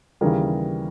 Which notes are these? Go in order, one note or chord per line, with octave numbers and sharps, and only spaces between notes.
D#2 C#3 E3 G3 G#4 A#4